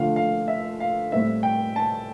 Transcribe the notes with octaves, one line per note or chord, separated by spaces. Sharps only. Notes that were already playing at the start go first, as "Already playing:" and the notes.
Already playing: D3 F3 A3 F5
F5
E5
F5
A2 G3 C4 E5
G5
A5